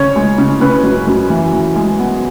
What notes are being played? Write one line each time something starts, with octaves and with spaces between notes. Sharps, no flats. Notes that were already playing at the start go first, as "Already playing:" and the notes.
Already playing: C#3 C#5
G#3
C#3
C#3 B4
F#2
F#2
E3
E3
G#3
B3